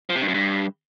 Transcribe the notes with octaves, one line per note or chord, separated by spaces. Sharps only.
F3
C3
G2
F#2
G2